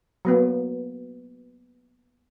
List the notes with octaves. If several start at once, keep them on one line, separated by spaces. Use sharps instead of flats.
F#3 A#3 B3